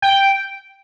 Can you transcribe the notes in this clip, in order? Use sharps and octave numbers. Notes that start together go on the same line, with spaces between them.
G5